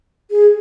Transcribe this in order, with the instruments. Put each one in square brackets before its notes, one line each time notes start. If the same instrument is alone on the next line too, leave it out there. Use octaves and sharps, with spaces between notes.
[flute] G#4